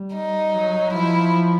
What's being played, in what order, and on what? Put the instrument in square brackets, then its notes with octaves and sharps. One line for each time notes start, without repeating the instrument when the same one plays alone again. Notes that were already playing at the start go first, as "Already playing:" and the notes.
Already playing: [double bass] G3
[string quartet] D#4
[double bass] F#3
[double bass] F3 [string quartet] E4